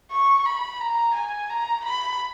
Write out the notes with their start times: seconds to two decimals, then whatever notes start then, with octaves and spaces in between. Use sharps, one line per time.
0.12 C#6
0.46 B5
0.81 A#5
1.16 G#5
1.50 A#5
1.85 B5